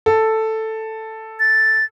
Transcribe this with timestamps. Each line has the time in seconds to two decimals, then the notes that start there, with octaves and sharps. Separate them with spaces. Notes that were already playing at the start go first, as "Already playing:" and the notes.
0.06 A4
1.40 A6